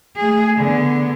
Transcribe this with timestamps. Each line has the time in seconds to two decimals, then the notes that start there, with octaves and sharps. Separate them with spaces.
0.16 A3 G#4
0.58 D3 B3